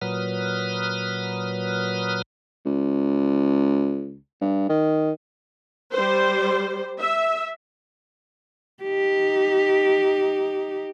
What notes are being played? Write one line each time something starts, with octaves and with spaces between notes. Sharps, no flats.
A#2 F#3 B4 D#6 F6
C#2
G2
D#3
G3 C5
E5
D#4 G4